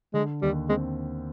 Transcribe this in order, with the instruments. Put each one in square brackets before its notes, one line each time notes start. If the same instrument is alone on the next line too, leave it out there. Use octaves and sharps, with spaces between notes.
[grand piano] D3 [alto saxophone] G#3
[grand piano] D#2 [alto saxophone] G3
[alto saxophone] G#3 [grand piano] C4